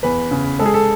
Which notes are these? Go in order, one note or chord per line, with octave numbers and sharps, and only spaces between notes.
E2 B4
C#3
G#3 A4
G#4
A4